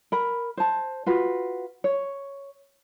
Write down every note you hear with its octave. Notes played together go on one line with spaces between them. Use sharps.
A#4 B5
C5 A5
F4 F#4 B4
C#5